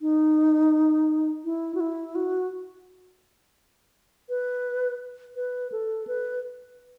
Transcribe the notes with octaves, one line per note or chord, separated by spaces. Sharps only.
D#4
E4
F#4
E4
F#4
B4
B4
A4
B4